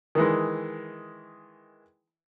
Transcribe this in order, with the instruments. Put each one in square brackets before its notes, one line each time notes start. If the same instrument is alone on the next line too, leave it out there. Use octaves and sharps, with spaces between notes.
[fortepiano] D#3 E3 G#3